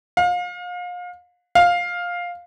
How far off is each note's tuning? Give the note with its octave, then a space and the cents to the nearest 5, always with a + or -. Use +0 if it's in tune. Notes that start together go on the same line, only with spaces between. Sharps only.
F5 +35
F5 +10